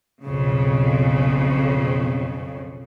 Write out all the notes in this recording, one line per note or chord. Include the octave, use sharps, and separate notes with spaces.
B1 F2 C#3